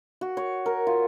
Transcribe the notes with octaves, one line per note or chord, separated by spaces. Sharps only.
F#4
C#5
A#4
F4